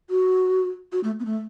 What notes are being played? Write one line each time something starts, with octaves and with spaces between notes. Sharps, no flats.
F#4
F#4
A3
B3
A3